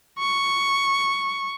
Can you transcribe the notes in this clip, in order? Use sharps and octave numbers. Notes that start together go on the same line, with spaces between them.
C#6